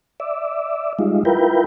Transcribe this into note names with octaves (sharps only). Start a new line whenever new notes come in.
D5 E5
G3 G#3 D#4 F4
E4 F4 A#4 B4 G5